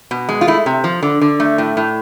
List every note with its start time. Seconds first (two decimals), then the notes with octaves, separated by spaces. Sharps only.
0.11 B2
0.29 G#3
0.41 F4
0.48 A3 E4
0.66 C3
0.84 F3
1.03 D3
1.21 D3
1.40 A3
1.58 A2
1.77 A2